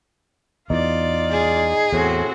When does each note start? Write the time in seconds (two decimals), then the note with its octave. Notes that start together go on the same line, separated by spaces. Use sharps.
0.70 E2 D#4 F4 D5
1.32 G#4
1.92 E2 A2 C4 F#4